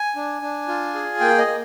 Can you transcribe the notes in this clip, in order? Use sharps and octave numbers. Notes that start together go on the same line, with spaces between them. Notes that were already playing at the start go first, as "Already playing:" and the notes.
Already playing: G#5
D4
D4
F4
G#4
A#3 G5
D#5
A#3